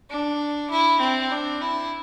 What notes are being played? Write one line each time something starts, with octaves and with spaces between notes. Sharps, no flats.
D4
E4
C4
D4
E4